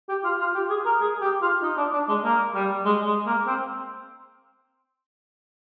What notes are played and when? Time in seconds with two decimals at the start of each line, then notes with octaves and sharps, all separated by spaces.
0.09 G4
0.24 F4
0.39 F4
0.54 G4
0.70 G#4
0.85 A#4
1.00 G#4
1.21 G4
1.42 F4
1.62 D#4
1.77 D4
1.93 D4
2.08 G#3
2.24 A#3
2.54 G3
2.85 G#3
3.06 G#3
3.26 A#3
3.46 C4